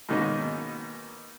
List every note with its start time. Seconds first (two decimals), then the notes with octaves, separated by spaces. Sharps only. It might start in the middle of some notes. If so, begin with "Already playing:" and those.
0.09 G#2 B2 D#3 A#3 C#4 D#4